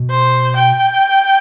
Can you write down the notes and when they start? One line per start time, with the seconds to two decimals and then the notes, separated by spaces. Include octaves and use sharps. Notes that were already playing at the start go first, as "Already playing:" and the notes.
Already playing: B2
0.10 C5
0.56 G5